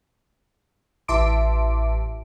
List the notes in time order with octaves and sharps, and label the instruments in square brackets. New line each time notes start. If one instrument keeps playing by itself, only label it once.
[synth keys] A1 E5 A5 C6 D6 D7